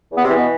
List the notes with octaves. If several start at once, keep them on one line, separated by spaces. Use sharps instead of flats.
E2
B3
C3 C4
E3
B2 B3